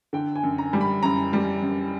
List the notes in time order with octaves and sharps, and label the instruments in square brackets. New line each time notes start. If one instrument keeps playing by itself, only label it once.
[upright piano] D3 G5
G#5
F#2
A#5
G3
B5
F#2 A#5
G3
F#2